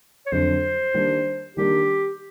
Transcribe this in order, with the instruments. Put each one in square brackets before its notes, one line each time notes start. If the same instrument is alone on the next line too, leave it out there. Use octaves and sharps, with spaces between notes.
[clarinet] C#5
[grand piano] F2 D3 F#3 [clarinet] C5
[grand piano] D#3 G3 A#3 D4
[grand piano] D#3 G3 A#3 D4 [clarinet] G4